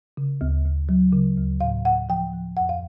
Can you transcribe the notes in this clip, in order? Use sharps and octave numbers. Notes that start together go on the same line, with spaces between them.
C#3
D2
D2
F#3
C#3
D2
A2 F5
A2 F#5
F3 G5
F3
F2 F#5
F5